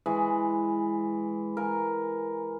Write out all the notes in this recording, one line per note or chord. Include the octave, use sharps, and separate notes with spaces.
E3 G#3
A#4 G#5